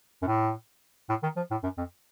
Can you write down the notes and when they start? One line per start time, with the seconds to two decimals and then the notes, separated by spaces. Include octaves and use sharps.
0.22 F#2
0.27 A2
1.09 A2
1.23 D#3
1.36 F3
1.51 A2
1.63 F#2
1.78 F2